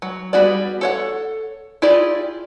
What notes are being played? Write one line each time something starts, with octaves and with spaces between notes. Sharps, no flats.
F#3
G3 B3 F#4 G#4 D5
A4 C#5 F#5
E4 F4 G4 G#4 D5